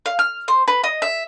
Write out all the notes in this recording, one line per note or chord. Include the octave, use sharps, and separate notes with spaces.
F5
F6
C5
B4
D#5
E5